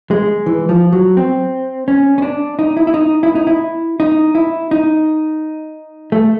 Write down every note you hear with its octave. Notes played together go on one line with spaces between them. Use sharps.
G#3
E3
F3
F#3
C4
C#4
C#4
D4
D#4
E4
E4
D#4
E4
D#4
E4
D#4
E4
D#4
A3